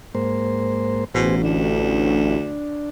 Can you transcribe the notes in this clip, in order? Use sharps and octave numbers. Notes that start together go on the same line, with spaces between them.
G#2 A#3 C5
A1 B2 G#4 C5
D2 D4